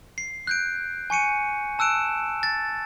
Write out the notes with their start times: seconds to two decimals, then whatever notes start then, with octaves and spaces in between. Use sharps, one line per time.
0.18 C7
0.47 F#6 G6 D7
1.10 G#5 C#6 C#7 D#7
1.79 A5 E6 F#6 D7 E7
2.43 A6